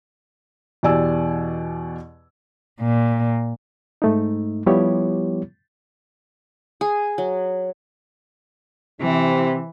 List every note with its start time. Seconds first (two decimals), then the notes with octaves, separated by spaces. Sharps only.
0.83 E2 B2 G4 D5 G#5 E6
2.82 A#2
4.02 G#2 A3 D#4
4.66 F3 G3 B3 E4 G4 C#5
6.81 G#4
7.18 F#3
9.00 C3 E3